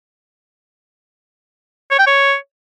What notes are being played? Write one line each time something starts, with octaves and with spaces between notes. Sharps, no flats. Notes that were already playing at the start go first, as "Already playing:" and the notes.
C#5
G5
C#5